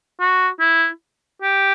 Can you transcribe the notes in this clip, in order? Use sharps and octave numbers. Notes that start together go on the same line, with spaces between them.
F#4
E4
G4